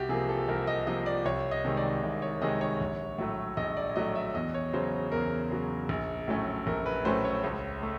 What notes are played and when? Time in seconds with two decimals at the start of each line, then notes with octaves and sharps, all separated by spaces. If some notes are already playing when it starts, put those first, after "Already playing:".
Already playing: C2 F#4 G4
0.09 C3 F3 A#3 G#4
0.29 A4
0.48 C2 A#4
0.67 D#5
0.87 C3 F3 A#3 D#5
1.06 D5
1.25 C2 C#5
1.51 D#5
1.65 C3 D#3 G#3
1.77 D5
2.03 C2
2.22 C#5
2.41 C3 D#3 G#3 D#5
2.61 C#5
2.81 A#1
3.18 A2 F#3 A3
3.57 A#1 D#5
3.77 D5
3.96 A2 F#3 A3 D#5
4.15 E5
4.34 E2 D#5
4.54 C#5
4.73 C#3 F#3 C5
5.12 E2 A#4
5.51 C#3 F#3
5.89 A#1
6.28 A2 F#3 A3 C#4
6.67 A#1 A#4
6.86 B4
7.05 A2 F#3 A3 C#4 C5
7.25 C#5
7.43 C#2 C#5
7.83 A3